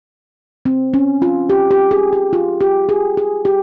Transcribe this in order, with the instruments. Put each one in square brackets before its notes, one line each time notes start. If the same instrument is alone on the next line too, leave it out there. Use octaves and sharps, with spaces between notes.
[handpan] C4
C#4
F4
G4
G4
G#4
G4
F4
G4
G#4
G#4
G4